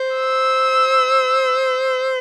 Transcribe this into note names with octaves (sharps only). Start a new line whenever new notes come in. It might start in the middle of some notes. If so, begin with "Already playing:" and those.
Already playing: C5
E6